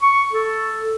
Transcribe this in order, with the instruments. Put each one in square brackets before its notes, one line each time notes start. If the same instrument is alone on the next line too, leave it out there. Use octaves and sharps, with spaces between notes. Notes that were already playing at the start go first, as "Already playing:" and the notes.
[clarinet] C#6
A4